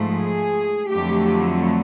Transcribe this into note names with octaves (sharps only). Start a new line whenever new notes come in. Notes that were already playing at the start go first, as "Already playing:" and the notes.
Already playing: G#2 F3 A3
G#4
F2 D3 F#3 A3 G4